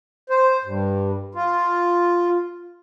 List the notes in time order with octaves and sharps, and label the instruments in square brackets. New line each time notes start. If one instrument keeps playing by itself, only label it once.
[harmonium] C5
G2
F4